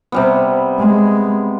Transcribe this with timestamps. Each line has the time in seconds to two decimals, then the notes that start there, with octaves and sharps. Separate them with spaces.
0.12 C3 G3 B3
0.79 G#3